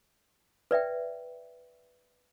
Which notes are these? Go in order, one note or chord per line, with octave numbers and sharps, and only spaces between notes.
B4 D5 E5 G5